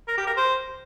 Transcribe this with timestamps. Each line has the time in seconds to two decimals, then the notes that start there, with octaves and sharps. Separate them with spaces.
0.08 A#4
0.17 G4
0.27 A#4
0.37 C5